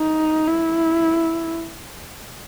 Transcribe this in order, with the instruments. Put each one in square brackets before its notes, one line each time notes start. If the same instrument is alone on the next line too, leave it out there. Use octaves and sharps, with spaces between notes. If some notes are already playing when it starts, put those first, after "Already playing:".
Already playing: [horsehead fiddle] D#4
E4